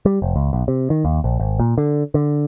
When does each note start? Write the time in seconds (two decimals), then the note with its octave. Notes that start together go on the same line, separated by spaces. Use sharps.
0.05 G3
0.22 F1
0.36 C#2
0.53 B1
0.68 C3
0.90 D#3
1.05 D#2
1.24 A#1
1.40 G#1
1.60 A#2
1.78 D3
2.14 D3